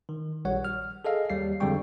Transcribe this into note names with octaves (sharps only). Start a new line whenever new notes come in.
D#3
A#1 G3 C#5 F#5
F6
G#4 A4 D#5 F5
D#2 G3 C7
F2 D3 G3 G#3 G5 C#6